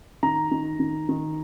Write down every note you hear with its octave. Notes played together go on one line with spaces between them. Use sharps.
D#3 A#5
D#3
D#3
D#3